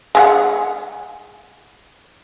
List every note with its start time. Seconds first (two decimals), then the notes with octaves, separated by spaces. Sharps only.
0.15 G#3 G#4 F#5